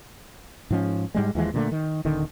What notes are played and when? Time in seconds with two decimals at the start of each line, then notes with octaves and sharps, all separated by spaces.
0.70 G#2 F3 C#4
1.15 G#2 G3 G#3
1.35 D#2 E3 F3 G#3
1.54 A#2 D3 G#3 A3
1.72 D#3
2.05 D#1 D3 D#3